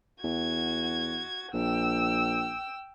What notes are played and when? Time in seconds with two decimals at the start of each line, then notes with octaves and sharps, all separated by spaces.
0.23 E2 F#4 G#6
1.54 A#1 G5 E6